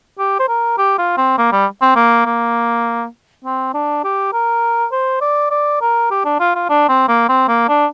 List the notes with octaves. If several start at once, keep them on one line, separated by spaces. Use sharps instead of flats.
G4
C5
A#4
G4
F4
C4
A#3
G3
C4
A#3
A#3
C4
D4
G4
A#4
C5
D5
D5
A#4
G4
D4
F4
F4
D4
C4
A#3
C4
A#3
D4